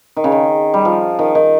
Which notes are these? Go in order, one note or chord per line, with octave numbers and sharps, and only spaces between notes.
D#3
C#3
D#3
G3
F3
D#3
D#3